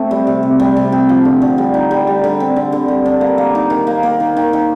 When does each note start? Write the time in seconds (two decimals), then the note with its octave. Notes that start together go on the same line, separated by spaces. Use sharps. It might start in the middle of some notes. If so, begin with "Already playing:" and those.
Already playing: A3 C4 A4
0.11 G3
0.27 C3
0.43 C3
0.60 G3
0.76 C3
0.92 G4
1.09 F3
1.25 D3
1.42 D3
1.58 G3
1.74 D#4
1.91 G3
2.07 G3
2.24 D3
2.40 C4
2.56 D3
2.72 D3
2.88 G3
3.06 D4
3.21 A#3
3.38 A#3
3.55 D#4
3.70 D#3
3.87 A#3
4.03 A#3
4.20 D#3
4.37 D#3
4.53 D#3